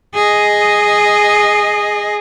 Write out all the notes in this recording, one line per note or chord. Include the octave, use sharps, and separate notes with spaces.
G#4 D#5